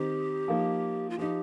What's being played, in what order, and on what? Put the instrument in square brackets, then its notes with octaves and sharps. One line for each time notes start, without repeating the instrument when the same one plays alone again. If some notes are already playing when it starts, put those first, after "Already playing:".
Already playing: [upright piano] D#3 C4 D#4 [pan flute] G4
[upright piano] F3 A#3 D#4
[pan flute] F4
[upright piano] F3 D#4 [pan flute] G4